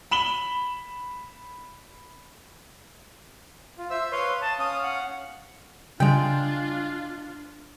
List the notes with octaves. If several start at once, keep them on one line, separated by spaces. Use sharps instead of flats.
B5 E7 F#7 G7
F4
C5 E5 E6
B4 C#5 F5 C6
A5 D#6
C#4 F5 D#6
F#5
C#3 G3 G#3 D4 F4 G5